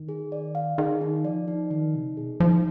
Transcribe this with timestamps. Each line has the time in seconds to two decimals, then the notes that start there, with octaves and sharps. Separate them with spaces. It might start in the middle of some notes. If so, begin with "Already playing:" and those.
Already playing: D#3
0.09 G#4
0.32 D5
0.55 F5
0.78 D#3 G#4
1.01 D#4
1.25 F3 D5
1.48 D#4
1.70 D#3 D#4
1.94 C3 D#4
2.17 B2 G#4
2.40 F3 D#4